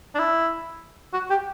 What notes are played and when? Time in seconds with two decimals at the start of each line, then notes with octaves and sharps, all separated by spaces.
0.15 D4
0.19 E4
1.13 F#4
1.30 G4